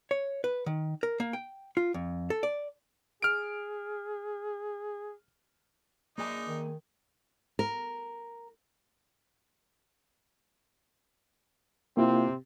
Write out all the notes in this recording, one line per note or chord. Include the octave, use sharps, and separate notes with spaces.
C#5
B4
D#3
A#4
A#3
G5
F4
F2
A4
D5
G#4 F6 D7
A#3 D4 D#4 G#4 G#5
D#3
A#4
C3 A#3 C4 E4 F4